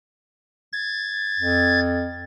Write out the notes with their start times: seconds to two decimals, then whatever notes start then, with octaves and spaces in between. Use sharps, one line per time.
0.73 G#6 A6
1.39 F2